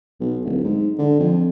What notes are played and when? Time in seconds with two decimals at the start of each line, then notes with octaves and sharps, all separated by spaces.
0.20 B1
0.45 D1
0.64 G#2
0.99 D3
1.20 F2